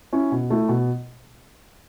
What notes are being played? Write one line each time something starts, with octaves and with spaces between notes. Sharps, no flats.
C#4 E4
B2
A3 E4
B2